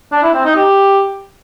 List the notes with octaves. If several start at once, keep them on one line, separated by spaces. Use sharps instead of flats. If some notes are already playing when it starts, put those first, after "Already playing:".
D4
E4
C4
D#4
G4